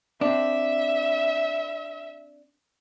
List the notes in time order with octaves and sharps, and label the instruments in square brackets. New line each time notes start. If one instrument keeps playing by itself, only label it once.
[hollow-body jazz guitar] C4 D4 [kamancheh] E5